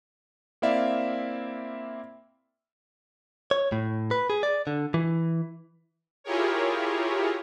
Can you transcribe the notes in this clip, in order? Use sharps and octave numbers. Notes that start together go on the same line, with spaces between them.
A#3 C4 E4 D5 E5 F5
C#5
A2
B4
G#4
D5
D3
E3
E4 F4 G4 G#4 A#4 C#5